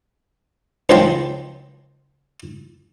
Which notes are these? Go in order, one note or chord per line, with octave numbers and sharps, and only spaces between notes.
C#2 D#3 F3 F#3 G5 C6